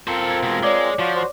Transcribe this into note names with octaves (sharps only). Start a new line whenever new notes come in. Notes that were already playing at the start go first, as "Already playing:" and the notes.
C4 F4 A4 A#4 C5
G#6
B2 G#3
G#3 C#5 D5 D6
F3 F4 F#4
F#4 C5